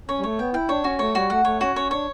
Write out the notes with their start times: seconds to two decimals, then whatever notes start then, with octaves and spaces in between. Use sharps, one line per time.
0.09 C#4 C#5
0.19 G3
0.23 A3 C#5
0.39 B3 G5
0.54 E4 G5
0.69 D4 C#5
0.84 C#4 F#4
0.99 A3 C#5
1.15 G3 F#4
1.30 A3 F#5
1.45 A3 C#5
1.61 C#4 F#4
1.76 C#4 C#5
1.91 D4 C#5